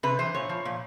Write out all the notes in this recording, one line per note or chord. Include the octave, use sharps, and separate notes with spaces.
C3 B4
E3 C5
A#2 C#5
F3
A#2